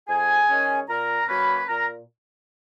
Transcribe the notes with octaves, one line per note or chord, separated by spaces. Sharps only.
F2 G#4 G#5
D#3 G#3 C#4
A#2 A#4 A#5
F#3 A#3 C#4 B4 B5
A#2 A#4 A#5